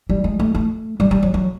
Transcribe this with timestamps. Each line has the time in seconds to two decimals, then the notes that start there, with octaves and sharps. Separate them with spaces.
0.09 G3
0.24 G#3
0.40 A3
0.55 A3
1.00 G3
1.11 G3
1.23 F#3
1.34 F#3